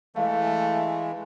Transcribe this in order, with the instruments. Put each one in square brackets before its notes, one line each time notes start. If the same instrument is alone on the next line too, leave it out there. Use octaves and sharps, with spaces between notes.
[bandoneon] E3 G#3 [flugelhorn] A3 [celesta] F5